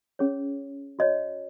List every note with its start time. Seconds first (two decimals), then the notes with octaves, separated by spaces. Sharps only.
0.19 C#4 G#4 C#5
0.99 F#4 C#5 D#5